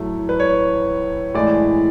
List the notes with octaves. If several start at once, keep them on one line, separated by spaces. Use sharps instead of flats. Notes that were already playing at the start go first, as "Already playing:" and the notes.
Already playing: A2 F#3 A3
B4
C#5
A2 E3 G#3 D5